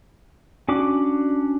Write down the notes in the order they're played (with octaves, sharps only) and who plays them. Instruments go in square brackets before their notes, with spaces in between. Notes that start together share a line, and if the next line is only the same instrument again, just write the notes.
[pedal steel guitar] C#4 D4 F#4 D6